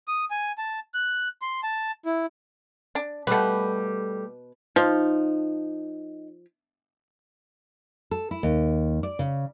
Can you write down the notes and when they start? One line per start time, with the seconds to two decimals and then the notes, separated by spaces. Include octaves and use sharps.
0.08 D#6
0.30 G#5
0.58 A5
0.94 F#6
1.42 C6
1.63 A5
2.06 E4
2.95 D4
3.27 B2 G3 A3 B4
4.76 F3 D#4
8.11 A4
8.31 E4
8.43 D#2
9.03 D5
9.19 C#3